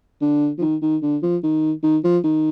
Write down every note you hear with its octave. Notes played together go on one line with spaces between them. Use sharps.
D3
F3
D#3
D#3
D3
F3
D#3
D#3
F3
D#3